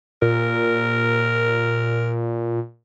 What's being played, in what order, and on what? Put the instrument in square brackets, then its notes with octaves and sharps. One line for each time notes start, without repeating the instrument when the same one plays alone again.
[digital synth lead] A#2 [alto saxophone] A#4